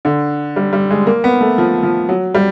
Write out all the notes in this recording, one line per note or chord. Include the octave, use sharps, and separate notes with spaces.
D3
G3
G3
G#3
A#3
B3
A3
F3
F3
F#3
G3